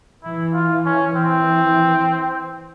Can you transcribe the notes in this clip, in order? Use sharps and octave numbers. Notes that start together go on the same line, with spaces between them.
E3 E4
F4
C#4
E3 C4